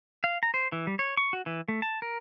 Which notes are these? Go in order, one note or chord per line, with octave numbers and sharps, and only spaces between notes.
F5
A#5
C5
E3
G3
C#5
C#6
F#4
E3
A3
A5
A#4